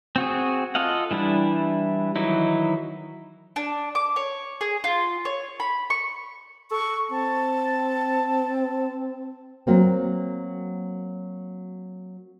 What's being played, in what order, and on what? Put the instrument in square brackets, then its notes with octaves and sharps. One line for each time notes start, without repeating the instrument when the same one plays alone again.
[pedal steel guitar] C4 F#4 G#4
F4 A4 D#5 F5 F#5
E3 G3 D4 E4
D#3 E3 F#3 D#4 E4
[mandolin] D4
D6
C#5
G#4
F4
C#5
B5
C#6
[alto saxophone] A4 [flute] C#6
[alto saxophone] C4 [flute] A5
[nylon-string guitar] F#3 A#3 C4